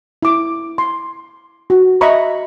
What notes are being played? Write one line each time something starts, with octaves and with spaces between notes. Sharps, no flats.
E4 D6
C6
F#4
D#5 E5 A#5 B5 C#6